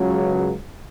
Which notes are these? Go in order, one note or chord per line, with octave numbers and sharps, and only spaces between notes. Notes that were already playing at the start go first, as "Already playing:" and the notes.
Already playing: C#2 C#3 F#3